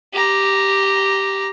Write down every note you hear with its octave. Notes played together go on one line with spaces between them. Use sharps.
G4 A#5